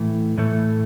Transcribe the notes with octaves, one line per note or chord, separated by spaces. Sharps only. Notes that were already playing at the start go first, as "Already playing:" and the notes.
Already playing: A2 E3 A3
A2 E3 A3